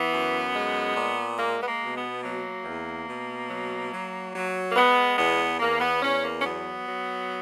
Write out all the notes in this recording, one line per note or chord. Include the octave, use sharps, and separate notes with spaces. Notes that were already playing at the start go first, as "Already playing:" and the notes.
Already playing: E3 B3
F#2
G#3
A#2
G#3 A#3
B3
A#3
B2
B3
F#3 A#3
E2
B2
F#3
F#3
F#3
A#3
G#3 B3
E2 B3
E2 A#3
B3
E2 C#4
A#3
C#4
F#3 B3
F#3